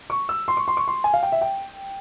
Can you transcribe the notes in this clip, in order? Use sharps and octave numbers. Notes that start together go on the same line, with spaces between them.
C#6
E6
C6
C#6
C6
C#6
C6
G#5
F5
G5
E5
G5